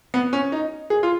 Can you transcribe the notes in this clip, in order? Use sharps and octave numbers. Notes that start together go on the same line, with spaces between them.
B3
C#4
D#4
G#4
F4